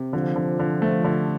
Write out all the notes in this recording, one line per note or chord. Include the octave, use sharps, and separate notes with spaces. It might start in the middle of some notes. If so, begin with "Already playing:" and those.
Already playing: C3
D3 F3
D3
D3
A3
D3